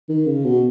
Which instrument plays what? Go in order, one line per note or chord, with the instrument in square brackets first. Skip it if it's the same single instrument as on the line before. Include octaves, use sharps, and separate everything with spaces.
[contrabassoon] D#3
C#3
B2